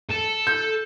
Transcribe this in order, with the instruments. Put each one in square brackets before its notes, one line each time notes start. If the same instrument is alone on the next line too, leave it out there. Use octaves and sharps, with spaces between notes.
[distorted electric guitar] A4
[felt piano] G6